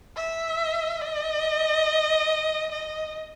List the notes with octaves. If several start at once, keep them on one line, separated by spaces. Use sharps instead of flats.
E5
D#5
D#5